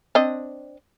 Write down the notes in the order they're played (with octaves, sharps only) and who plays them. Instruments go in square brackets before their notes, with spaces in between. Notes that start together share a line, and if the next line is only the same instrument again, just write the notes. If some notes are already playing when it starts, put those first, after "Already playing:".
[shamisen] C4 D4 D#5